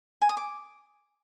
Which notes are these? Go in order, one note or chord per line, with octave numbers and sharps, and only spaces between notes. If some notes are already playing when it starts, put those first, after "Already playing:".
G#5
D#6
D6